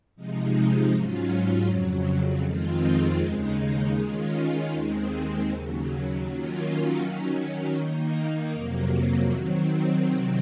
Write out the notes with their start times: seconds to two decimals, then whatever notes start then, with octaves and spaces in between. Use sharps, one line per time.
0.16 C3 F3 G#3 D#4
0.91 G#2 F#3 C#4 F4
1.67 F2 C#3 F#3
2.43 F2 D#3 G#3 C4 F4
3.19 D#2 C#3 G#3 D#4
3.96 D#3 G#3 C#4 F4
4.71 D#2 D#3 G#3 C4
5.48 D#2 C#3 F#3
6.24 D#3 F#3 A#3 C#4 F4
7.01 D#3 F#3 C#4
7.76 D#3 A#3 D#4
8.53 F2 C3 F#3 A#3
9.30 D#3 F#3 C4
10.05 C3 D#3 F#3 C4